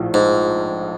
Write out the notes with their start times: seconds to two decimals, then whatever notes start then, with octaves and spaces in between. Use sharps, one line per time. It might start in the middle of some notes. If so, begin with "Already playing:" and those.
Already playing: A#1 A2 F3
0.14 G#2